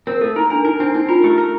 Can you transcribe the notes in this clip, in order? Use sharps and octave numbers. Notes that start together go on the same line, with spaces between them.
C4 A#4
A3 A4
D#4 A#4
D4 A#4
D#4 A#4
C4 D4
C4 D#4
F4 A#4
A3 G4
A#4